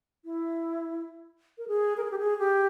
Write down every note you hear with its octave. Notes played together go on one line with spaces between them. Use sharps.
E4
A#4
G#4
A#4
G#4
G4
G#4
G4